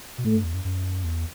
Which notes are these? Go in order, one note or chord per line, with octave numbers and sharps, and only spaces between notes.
B2
A2 A3
G2
E2
F#2
F#2
E2